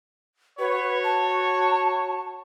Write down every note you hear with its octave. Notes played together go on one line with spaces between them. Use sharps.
F#4 B4 C#5
A5